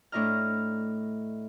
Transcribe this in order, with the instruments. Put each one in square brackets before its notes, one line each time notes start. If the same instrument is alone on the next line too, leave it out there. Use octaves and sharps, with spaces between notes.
[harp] A2 D4 E4 D#5 A#5 F6